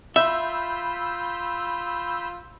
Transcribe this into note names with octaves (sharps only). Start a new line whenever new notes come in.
F4 E5 B5 E6 G6